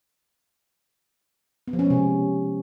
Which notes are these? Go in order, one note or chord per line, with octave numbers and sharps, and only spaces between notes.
B3
F3
C#4
G#3
C3